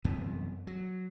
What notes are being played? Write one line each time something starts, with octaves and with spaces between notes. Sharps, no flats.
C2 F#2 E3 B3
F#3